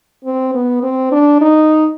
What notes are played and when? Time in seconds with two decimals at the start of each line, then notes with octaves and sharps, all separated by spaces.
0.25 C4
0.55 B3
0.83 C4
1.12 D4
1.41 D#4